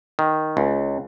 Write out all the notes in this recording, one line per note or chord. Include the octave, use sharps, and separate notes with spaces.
D#3
C#2